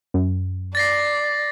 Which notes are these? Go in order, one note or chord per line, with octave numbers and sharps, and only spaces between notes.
F#2
D5 A6 A#6 C7